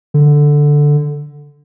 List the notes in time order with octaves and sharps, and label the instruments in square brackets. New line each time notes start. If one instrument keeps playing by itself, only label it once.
[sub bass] D3